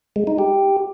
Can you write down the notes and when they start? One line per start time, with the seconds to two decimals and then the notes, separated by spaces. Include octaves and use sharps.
0.16 G#3
0.27 D#4
0.39 G4